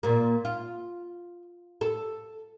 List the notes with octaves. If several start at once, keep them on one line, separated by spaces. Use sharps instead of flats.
A#2 A#3
F4
A4